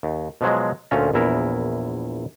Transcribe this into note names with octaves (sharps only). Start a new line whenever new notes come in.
D#2
B2 F3 F#3 G#3
D2 A#2 A3 C#4 F4 A#5
A#1 E2 E4 A#4